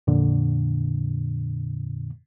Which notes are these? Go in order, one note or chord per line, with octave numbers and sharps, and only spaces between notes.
F2 A#2 D3